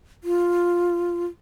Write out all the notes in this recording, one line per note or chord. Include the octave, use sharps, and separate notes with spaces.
F4